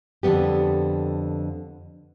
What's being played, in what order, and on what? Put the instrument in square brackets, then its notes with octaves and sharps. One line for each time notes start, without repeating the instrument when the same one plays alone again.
[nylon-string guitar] F2 D3 G3 B3 G4